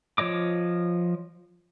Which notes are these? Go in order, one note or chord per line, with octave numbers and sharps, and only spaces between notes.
F3 C#5 D#5 D6